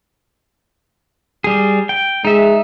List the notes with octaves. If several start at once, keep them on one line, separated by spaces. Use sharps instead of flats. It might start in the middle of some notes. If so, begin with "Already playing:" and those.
G3 G#4
G5
G#3 D#4 E5